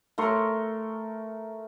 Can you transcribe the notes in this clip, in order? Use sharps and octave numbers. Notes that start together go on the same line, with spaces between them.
A3 A#4 C6 C#6